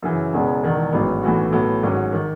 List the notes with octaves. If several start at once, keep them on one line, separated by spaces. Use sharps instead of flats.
F#2 C#3 E3
E1 E2 C#3 G#3 B3
E1 E2 D#3
A1 G#2 F#3 B3
B1 A2 E3 B3 F#4
A2 F#3 B3
G#1 G#2 F#3 C#4
D#3